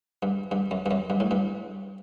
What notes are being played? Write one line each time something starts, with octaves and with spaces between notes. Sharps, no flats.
G2
G2
F#2
G2
F#2
G2
A2
G2